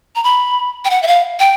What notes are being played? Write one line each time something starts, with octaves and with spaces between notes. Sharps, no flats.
A#5
B5
G5
F#5
E5
F5
G5